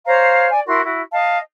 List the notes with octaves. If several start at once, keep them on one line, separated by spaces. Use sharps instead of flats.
C5 C#5 F5 A#5
D5 G#5
E4 F#4 A#4 C6
E4 F#4
D#5 F5 A5